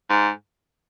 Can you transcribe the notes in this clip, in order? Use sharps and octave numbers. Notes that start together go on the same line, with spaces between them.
G#2